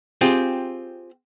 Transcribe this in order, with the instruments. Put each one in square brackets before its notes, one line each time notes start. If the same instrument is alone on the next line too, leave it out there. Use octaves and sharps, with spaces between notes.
[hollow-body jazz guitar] C4 F4 G4 G#4